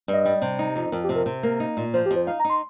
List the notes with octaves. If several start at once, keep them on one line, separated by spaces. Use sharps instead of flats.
G2 D#5
G3
C3
D#4
F2
F2 A#4
G4
C3
A#4
C3
A#3 A#4
D#4
A#2
F3 C5
G4
F2
C5
D#4 F5
A#5
D#4
C6